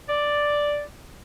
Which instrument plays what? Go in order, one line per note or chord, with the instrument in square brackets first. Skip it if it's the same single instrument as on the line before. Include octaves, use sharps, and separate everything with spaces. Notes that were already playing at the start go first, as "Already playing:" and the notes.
[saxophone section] D5